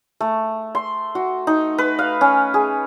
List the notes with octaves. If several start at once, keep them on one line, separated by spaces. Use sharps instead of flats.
A3
C6
F#4
D#4
B4
F5
C#4
G#4